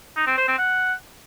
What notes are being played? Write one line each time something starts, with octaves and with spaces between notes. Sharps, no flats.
D#4
C4
C5
C4
F#5